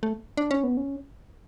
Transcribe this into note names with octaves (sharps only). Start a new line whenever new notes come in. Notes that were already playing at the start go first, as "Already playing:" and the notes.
A3
D4
C#4
B3
C#4